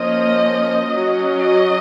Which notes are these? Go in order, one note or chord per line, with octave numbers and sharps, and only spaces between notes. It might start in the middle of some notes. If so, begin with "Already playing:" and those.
Already playing: F3 A#3 C#4 D#5
F#3 C#4
D#5